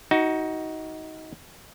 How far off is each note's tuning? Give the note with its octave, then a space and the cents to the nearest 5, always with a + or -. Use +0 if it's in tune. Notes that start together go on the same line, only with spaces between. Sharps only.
D#4 +20 F#4 +15